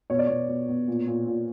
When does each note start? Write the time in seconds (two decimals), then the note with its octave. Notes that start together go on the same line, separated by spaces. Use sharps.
0.10 B2 C#5
0.19 D5
0.26 B2 C#5
0.48 B2
0.68 B2
0.88 A#2
1.07 A#2
1.27 A#2